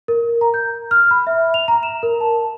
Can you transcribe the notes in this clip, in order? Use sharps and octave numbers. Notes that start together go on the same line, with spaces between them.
A#4
A#5
G6
F6
B5
E5
F7
A#5
E7
A#4
A5